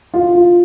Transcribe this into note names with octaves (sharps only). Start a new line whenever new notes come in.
F4
F4